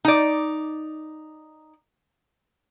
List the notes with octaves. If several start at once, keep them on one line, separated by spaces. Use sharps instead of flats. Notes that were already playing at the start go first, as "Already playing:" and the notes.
D#4 D5